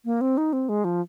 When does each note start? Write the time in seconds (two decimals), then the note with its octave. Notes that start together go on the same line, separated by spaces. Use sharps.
0.05 A#3
0.21 C4
0.37 D#4
0.53 C4
0.69 G#3
0.84 F3